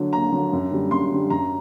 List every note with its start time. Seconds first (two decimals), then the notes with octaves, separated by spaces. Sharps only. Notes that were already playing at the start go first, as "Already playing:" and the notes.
Already playing: D3 F#3
0.13 D#2 A#5
0.32 D3 F#3
0.53 F#2
0.71 D3 G3
0.91 F#2 C6
1.12 D3 G3
1.30 F#2 A#5